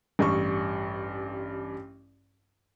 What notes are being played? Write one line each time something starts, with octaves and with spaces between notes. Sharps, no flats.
A1 G2 C#6